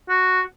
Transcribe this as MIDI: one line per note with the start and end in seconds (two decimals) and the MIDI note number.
0.09 0.41 66